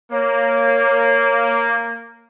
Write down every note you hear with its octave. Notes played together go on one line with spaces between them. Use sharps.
A#3 C#5